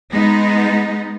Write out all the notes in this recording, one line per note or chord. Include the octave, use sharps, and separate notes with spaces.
G#3 B3 D#4